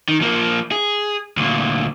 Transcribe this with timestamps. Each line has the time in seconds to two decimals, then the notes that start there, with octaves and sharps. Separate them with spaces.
0.09 D#3
0.21 F3 A#3
0.72 G#4
1.37 D2 A#2